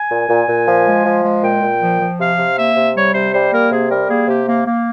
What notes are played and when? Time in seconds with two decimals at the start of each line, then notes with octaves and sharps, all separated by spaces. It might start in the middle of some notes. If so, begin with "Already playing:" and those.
Already playing: G#5
0.10 A#2
0.29 A#2
0.48 A#2
0.67 F3
0.86 G#3
1.05 F3
1.24 G#3
1.43 A#2 G5
1.62 A#2
1.81 F3
2.00 F3
2.19 C3 F5
2.38 C3
2.57 A#3 E5
2.76 C3
2.95 G3 C#5
3.14 C3 C5
3.33 G3 C5
3.52 A#3 A#4
3.71 C3 G#4
3.90 G3 A#4
4.09 A#3 G#4
4.28 C3 G4
4.46 A#3
4.66 A#3